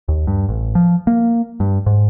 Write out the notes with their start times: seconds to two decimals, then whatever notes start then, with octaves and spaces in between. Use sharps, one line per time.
0.08 D#2
0.27 G2
0.49 A1
0.75 F3
1.07 A#3
1.60 G2
1.86 G#2